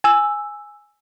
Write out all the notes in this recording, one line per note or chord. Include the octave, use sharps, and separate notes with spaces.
G#5 E6